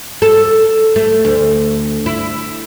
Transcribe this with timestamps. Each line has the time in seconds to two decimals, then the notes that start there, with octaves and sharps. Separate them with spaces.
0.22 A4
0.96 A3
1.25 D2
2.06 E4